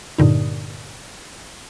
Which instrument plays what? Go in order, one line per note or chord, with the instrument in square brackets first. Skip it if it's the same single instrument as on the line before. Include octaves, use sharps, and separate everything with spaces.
[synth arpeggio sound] G2 A#2 D3 D#4